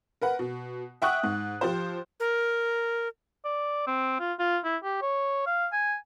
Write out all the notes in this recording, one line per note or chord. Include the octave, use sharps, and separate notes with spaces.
A#4 B4 F#5
B2
E5 F#5 G5 C#6 D#6 F#6
G#2
F3 F4 G4 C5
A#4
D5
C4
F4
F4
E4
G4
C#5
F5
G#5